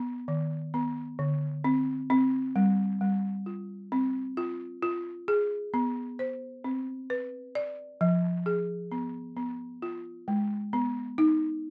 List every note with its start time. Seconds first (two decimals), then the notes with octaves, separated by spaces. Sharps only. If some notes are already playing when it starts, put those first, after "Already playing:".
Already playing: B3
0.28 D#3
0.74 B3
1.19 D3
1.64 C4
2.10 C4
2.56 G3
3.01 G3
3.46 F4
3.92 C4
4.37 F4
4.83 F4
5.28 G#4
5.74 B3
6.19 C5
6.64 C4
7.10 B4
7.55 D5
8.01 F3
8.46 G#4
8.92 B3
9.37 B3
9.82 F4
10.28 G#3
10.73 B3
11.18 D#4